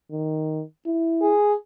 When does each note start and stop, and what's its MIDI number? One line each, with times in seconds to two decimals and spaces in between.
0.12 0.63 51
0.86 1.34 64
1.22 1.53 68